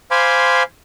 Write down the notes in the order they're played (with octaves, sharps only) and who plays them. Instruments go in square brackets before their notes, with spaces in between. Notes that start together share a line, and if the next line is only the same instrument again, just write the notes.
[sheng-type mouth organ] C5 F5 G#5 B5 C6 D6